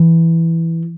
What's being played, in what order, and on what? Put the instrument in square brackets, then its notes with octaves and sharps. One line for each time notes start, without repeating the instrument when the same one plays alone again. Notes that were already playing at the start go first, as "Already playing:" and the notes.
Already playing: [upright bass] E3